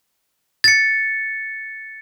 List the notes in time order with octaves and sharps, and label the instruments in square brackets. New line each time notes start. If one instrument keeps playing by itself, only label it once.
[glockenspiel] A6 C#7